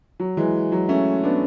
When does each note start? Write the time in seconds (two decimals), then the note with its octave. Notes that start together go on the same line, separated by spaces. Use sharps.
0.20 F#3
0.37 E3 G#3
0.72 F#3
0.89 A3 C#4
1.24 B3 D4